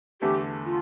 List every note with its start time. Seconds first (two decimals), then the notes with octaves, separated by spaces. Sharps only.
0.21 E2 D3 A3 G4
0.66 F4